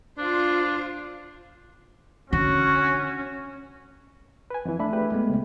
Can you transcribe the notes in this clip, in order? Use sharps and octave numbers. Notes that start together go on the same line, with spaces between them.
D4 F4 C5
D3 C#4 F#4
B4 G#5
F2 E3
A3 D4 E5 B5
G4 G#4 B4
G#3 A3 B3
C#2 A#2